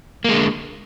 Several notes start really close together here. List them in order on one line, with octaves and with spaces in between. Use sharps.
A#3 G#3 D3